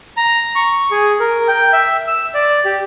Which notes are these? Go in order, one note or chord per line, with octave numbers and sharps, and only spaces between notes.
A#5
C#6
G#4
A#4
G5
E5
E6
D5
G4